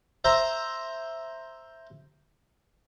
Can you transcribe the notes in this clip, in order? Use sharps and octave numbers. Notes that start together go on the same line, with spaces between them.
C5 E5 A#5